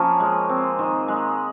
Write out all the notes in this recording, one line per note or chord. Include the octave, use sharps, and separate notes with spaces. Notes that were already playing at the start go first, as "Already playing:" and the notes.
Already playing: F3 A#3 C#4
G#3
C4
D#3
G#3